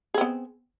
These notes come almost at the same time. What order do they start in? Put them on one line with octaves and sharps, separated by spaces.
G#4 C4 B3